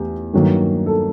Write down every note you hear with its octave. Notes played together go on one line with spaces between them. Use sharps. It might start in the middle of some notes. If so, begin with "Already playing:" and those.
Already playing: E2 A3 G4
G2 D#3 F#3 A#3
A4